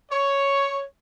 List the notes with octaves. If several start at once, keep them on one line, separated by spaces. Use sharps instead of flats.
C#5